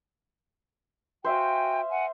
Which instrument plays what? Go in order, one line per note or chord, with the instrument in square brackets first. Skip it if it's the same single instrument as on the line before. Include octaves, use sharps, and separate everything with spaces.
[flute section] F#4 G5 G#5 [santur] C5 E5 F5
[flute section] F#5 G#5